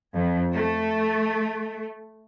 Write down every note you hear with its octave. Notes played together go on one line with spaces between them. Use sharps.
F2
A3